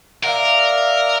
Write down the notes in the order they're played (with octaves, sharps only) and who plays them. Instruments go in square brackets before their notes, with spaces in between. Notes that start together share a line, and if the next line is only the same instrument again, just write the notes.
[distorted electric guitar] A#4 [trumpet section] D5 E5 F5